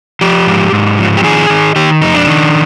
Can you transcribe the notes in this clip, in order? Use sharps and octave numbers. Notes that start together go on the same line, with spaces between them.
F3 G4
G#2
G#2
F3
G4
D#3 G#4
D#3
D#3 G4
F2 D#4
D4
D#3